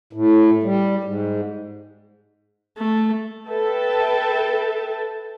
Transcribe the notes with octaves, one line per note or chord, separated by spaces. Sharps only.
A2
G3
G#2
A3
A4 B4 E5 G5 A5